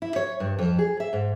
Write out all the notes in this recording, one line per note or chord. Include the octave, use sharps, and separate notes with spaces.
E4
C#5
G2
F2
G#4
E5
G#2